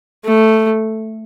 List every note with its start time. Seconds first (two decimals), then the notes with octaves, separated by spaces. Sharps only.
0.25 A3